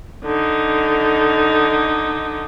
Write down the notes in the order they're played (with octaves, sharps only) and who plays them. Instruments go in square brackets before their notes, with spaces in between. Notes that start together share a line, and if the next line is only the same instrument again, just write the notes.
[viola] D3 D#4